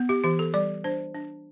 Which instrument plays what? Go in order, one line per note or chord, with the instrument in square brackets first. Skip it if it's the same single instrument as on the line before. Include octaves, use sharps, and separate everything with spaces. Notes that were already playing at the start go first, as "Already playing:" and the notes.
Already playing: [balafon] B3
G4
E3 G4
A4
G3 D5
D4 C5
D4